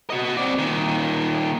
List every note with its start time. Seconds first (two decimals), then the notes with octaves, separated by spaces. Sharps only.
0.10 F#4 D#5
0.37 C4 D5
0.58 A#2 D#3